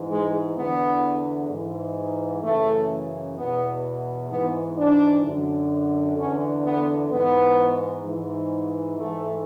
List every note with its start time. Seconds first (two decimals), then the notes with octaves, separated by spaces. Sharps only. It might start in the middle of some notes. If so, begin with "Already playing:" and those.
Already playing: G#2 E3
0.10 G#3
0.56 E2 D3 B3
1.50 G#2 E3
2.43 F#2 C#3 E3 A3
3.37 E2 B2 B3
4.30 G#2 E3 B3
4.77 D4
5.24 F#2 D3
6.17 E2 D3 C#4
6.65 B3
7.11 G#2 E3 B3
8.05 G#2 E3
8.99 G#2 E3 A3